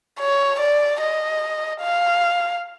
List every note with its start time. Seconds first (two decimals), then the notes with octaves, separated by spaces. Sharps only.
0.19 C#5
0.60 D5
1.00 D#5
1.81 F5